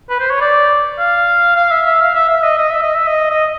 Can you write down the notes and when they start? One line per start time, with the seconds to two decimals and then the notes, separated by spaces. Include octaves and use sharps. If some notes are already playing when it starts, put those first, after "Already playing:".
0.10 B4
0.19 C5
0.30 C#5
0.41 D5
0.99 F5
1.56 F5
1.71 E5
1.86 E5
2.01 F5
2.15 E5
2.29 E5
2.43 D#5
2.58 D#5
2.71 E5
2.83 D#5
2.95 E5
3.07 D#5
3.30 D#5